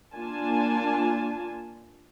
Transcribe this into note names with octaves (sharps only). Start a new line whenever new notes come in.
A#3 D4 F4 G#5 A5